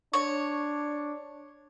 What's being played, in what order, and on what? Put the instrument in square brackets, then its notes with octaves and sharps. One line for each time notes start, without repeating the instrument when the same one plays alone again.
[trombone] D4 [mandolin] C#5